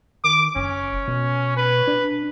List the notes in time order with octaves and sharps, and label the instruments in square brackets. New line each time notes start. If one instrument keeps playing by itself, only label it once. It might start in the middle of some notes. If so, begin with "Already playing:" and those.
[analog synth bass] D#3 [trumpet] D6
[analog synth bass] F#1 [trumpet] C#4
[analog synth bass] B2
[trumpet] B4
[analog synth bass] D4